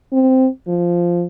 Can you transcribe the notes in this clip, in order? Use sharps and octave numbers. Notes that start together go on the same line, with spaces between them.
C4
F3